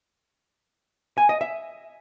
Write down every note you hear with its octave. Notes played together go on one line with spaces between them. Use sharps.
G#5
D#5
E5